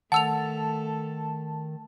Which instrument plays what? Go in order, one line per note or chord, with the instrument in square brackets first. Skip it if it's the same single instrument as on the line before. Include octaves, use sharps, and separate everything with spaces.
[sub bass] D#3 [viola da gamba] A3 A4 [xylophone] F#5 E6 F7 [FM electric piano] A5